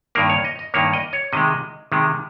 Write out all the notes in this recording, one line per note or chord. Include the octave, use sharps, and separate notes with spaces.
G2 D#3 A#3 A#4
C#5
D#5
D#5
G2 D#3 A#3 C#5
D#5
C#5
C3 D#3 G#3 D#5
C3 D#3 G#3